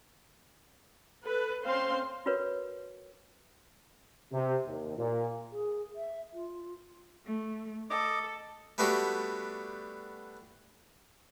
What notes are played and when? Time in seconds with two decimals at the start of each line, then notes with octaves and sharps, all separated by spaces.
1.23 A4 B4
1.66 C4 C#4 C5 F5 C6
2.26 F4 F#4 A#4 B4 C#5
4.33 C3
4.67 D#2
4.98 A#2
5.52 G#4
5.96 E5
6.33 F4
7.25 A3
7.90 A4 D#5 D6
8.78 G3 A3 B3 D4 F#4 G4